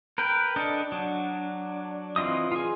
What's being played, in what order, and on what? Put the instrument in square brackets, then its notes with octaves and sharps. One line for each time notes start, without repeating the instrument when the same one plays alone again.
[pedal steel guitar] A#4 B4 G5
D4 A4 D#5
F#3 D4
E3 C4 F4 D#5 D#6
F4 G#4